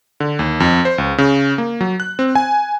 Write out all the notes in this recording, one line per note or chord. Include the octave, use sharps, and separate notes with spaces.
D3
D#2
F2
C5
C#2
C#3
A#3
F#3
F#6
C4
G#5